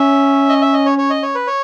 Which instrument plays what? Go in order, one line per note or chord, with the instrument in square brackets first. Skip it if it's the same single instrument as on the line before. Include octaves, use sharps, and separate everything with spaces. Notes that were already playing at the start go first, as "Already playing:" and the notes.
Already playing: [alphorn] C#4 [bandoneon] E5
[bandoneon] D#5
E5
D#5
C#5
C#5
D#5
C#5
B4
C#5